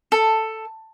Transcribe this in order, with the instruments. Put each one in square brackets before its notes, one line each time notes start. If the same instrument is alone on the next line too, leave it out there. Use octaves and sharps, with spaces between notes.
[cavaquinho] A4